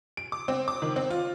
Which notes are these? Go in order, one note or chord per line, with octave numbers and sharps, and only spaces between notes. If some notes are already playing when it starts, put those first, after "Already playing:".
D7
D6
C4
D6
D#3
C4
F4